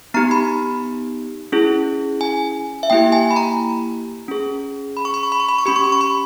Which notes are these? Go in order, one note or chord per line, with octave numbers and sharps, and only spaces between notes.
B3 D#4 G4 A#5
B5
C#4 E4 G#4
G#5
E5
A#3 E4 G4 G5
G#5
B5
A#5
C#4 G#4
B5
C#6
B5
C#6
B5
C#6
B5
C#6
C#4 G4 B5
C#6
B5
C#6
B5